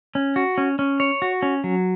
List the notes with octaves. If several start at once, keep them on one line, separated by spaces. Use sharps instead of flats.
C#4
F#4
C#4
C#4
C#5
F#4
C#4
F#3